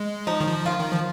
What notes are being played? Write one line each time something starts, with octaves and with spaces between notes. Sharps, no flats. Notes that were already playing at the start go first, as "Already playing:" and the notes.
Already playing: G#3
F3 D#4
D#3
F3
D#3 F4
D#3
F3